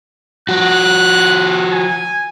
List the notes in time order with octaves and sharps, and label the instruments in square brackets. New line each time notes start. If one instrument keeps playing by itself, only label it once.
[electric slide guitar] F3 F#4 [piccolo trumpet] F#6
[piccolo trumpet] G#5